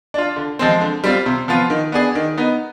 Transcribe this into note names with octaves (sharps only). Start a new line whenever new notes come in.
D4 F4
D3
F3 G#3 C4
D3
G3 C4 F4
C3
F3 B3 F4
D#3
B3 D4 G#4
D#3
B3 D#4